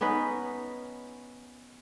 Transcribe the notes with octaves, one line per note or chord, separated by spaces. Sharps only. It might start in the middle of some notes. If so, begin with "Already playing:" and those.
B3 C#4 D#4 B4